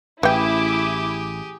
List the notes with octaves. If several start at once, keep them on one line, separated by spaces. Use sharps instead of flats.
A1 E3 E4 G4 G#4 G5 D6